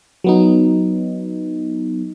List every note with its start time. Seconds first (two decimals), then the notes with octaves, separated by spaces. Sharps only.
0.24 F#3 B3 D#4